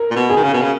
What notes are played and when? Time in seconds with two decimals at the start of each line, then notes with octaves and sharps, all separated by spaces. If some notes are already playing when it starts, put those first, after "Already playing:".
Already playing: A#4
0.11 A#2
0.16 B2
0.30 G#4
0.36 D#3
0.43 C#3
0.53 B2
0.62 C#3